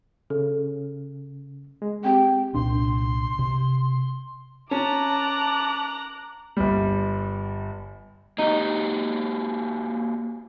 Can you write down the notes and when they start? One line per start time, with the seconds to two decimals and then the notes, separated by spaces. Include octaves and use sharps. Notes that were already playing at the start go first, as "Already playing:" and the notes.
0.30 C#3 A4
1.82 G#3
2.05 C4 G4 G5
2.55 C2 A#2 D4 C6
3.39 C3
4.71 C#4 A5 A#5 D6 F#6
6.57 G1 G3
8.38 A#3 D#4 F#4 G4